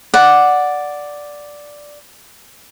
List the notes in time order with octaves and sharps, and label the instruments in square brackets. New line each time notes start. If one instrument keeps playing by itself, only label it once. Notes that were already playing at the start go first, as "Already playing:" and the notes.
[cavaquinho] D5 F#5